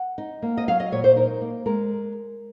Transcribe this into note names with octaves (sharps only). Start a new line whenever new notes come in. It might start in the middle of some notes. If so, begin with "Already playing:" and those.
Already playing: F#5
D#4
A#3
D#5
F#3 F5
D#5
A#2 C#5
C5
D#4 A#4
A#3
G#3 A#4